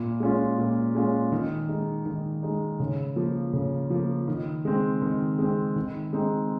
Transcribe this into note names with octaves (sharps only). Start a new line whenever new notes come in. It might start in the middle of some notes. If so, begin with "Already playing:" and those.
Already playing: A#2
G#3 C#4 F4
A#2
G#3 C#4 F4
D#3
G#3 D#4
D#3
G#3 D#4
C#3
F3 A#3
C#3
F3 A#3
D#3
G#3 C4
D#3
G#3 C4
D#3
G#3 C4 D#4